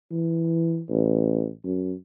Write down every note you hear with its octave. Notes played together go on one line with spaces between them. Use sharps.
E3
A1
F#2